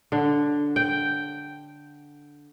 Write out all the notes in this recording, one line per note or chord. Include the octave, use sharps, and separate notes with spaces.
D3
G5